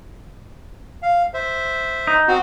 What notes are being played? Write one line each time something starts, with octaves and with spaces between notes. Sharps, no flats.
F5
C5 E5
D#4
C4 F#4